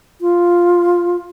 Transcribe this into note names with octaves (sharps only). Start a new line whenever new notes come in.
F4